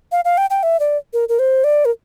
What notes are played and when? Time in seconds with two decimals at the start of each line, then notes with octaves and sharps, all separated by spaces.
0.12 F5
0.25 F5
0.38 G5
0.50 G5
0.63 E5
0.80 D5
1.13 A#4
1.29 A#4
1.39 C5
1.64 D5
1.85 A#4